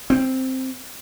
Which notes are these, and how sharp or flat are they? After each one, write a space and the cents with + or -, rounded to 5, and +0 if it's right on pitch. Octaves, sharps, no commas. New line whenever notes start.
C4 +0